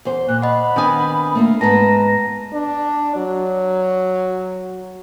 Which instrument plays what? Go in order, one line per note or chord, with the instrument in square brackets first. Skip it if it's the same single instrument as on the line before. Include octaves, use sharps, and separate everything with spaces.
[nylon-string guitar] E2 C5
[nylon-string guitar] A#2 [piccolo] F#6
[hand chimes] D#5 F#5 [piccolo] B5
[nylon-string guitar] D#3 B3 G#5 [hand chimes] C4 D4 D#6
[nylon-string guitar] A3 A#3 F4
[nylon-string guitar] G#2 B3 B4 [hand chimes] A5 A#5 [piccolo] A#6
[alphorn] D4
F#3